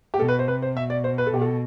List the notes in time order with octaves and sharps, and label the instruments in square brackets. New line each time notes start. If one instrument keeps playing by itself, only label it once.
[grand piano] G4
[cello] B2 [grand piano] A4
[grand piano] B4
C5
[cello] C3 [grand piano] B4
[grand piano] C5
[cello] B2 [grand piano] E5
[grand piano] D5
C5
B4
A4
[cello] B2 [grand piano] G4
[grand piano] A4